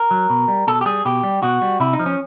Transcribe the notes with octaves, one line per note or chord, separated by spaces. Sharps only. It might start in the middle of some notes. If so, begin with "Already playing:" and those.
Already playing: A#4
F#3
B2
G3
B2 A4
G4
G3 G#4
B2 G4
G3
B2 F#4
G3
C3 E4
D#4
F3
C#4